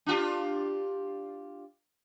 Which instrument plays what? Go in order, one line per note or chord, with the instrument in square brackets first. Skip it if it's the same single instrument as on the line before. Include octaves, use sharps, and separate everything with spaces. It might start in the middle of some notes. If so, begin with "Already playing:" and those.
[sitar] D4 F4 G4